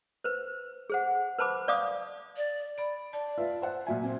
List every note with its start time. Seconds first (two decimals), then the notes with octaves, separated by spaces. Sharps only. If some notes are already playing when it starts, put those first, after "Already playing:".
0.24 B4 C5
0.90 G#4 C5 F#5
1.39 B4 C5 A5 B5 D6
1.68 D5 F5 D6 D#6
2.37 D5
2.78 D5 B5
3.13 D5 A5
3.38 F4 B4 E5
3.62 C5 F#5
3.87 A#2 F#3 E5 G#5
4.03 C4